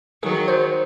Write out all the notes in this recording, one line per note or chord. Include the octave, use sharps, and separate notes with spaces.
D#3 F#3 G#4
C5